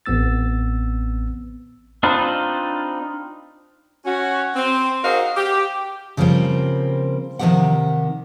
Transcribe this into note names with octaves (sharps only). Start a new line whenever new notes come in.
A1 B3 C4 E6 A6
C4 D4 D#4 F4 B4
C#4 F#4
C4
D#4 F#4 G#4 A#4 C5 F5
G4
C#3 F3 G3 A#3 C4
C3 D#3 F3 A3 G4 F#5